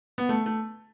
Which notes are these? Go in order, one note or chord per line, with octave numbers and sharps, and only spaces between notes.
B3
A3
A3